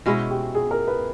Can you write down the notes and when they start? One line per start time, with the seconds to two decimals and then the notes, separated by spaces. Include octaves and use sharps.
0.06 B2 G#3 C#4 E4 F#4
0.31 G4
0.55 G#4
0.71 A#4
0.88 B4